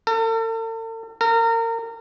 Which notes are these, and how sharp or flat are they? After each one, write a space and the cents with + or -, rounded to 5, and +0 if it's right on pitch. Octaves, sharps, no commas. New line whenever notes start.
A4 +45
A#4 -30